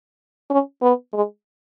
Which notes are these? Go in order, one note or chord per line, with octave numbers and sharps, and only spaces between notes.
C#4
B3
G#3